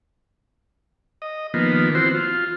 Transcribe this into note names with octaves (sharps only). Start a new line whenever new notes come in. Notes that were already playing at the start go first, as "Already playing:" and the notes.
D#5
D#3 F3 A#3 B3
E3 C4 F#4 C5
F4